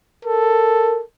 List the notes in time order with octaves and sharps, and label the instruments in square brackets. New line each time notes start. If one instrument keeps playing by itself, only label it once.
[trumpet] A4 [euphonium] A#4